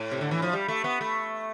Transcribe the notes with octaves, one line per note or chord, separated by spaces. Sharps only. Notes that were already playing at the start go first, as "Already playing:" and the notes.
Already playing: A2
C3
D3
E3
F3
G3
A3
B3
A3